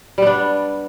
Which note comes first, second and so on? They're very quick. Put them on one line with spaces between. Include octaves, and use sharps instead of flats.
G3 B3 D4